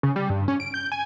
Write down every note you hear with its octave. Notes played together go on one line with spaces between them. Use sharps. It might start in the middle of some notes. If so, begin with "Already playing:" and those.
C#3
G3
G2
C#4
D7
G6
G#5